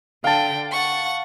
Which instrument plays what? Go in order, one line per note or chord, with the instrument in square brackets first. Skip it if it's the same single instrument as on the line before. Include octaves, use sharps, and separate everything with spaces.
[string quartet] D3 G5 [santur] F5 A5
[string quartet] F#5 C#6